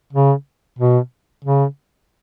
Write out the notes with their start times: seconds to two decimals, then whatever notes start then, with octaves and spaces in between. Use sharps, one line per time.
0.13 C#3
0.79 B2
1.45 C#3